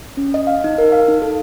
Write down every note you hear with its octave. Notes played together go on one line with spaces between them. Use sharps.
C#4
D#5
F5
D#4
A#4
F5
D#4
A4